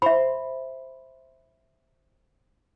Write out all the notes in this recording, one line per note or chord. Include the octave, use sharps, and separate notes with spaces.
C5 E5 B5